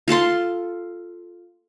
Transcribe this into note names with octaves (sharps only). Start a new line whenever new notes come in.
F4 A4 A5 C6